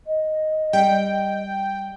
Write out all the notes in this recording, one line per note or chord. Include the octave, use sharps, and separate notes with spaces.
D#5
G3 G5